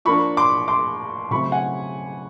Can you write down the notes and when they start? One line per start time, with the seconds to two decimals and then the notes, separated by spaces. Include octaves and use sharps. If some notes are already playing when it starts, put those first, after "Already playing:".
0.05 F3 A#3 D4 B5 C#6
0.37 C6 D6
0.68 C6 D6
1.31 C#3 F#3 A3 C4 B5 C#6
1.52 F#5 G#5